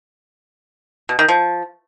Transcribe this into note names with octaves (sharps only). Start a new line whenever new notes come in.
B2
D#3
F3